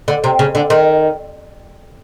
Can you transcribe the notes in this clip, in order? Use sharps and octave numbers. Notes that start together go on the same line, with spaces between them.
D3
C3
C#3
D3
D#3